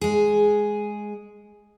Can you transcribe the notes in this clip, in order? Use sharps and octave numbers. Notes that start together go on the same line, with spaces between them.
G#3 G#4